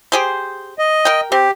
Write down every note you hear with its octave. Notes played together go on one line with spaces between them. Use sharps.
G4 G#4 C5
D#5
A#4 G5
C4 G4